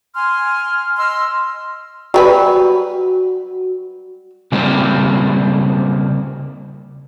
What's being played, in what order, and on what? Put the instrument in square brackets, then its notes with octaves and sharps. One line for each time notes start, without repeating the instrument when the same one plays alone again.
[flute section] G#5 C6 F6
D#5 C6 E6 F6
[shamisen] F#3 G3 B4 [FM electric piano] F#4
[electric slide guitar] C#3 G3 A#3 C4